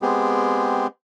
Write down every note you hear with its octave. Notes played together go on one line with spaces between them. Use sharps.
G#3 B3 C4 G4 G#4